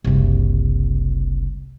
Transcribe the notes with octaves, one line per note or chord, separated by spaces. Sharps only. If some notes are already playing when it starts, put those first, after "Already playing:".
F#1 C2